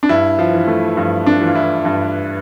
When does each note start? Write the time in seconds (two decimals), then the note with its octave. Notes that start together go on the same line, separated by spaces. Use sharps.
0.03 D4
0.09 G2 E4
0.39 F3
0.53 E3
0.67 A3
0.97 G2 F3
1.26 D4
1.41 E3
1.47 F4
1.55 E4
1.85 G2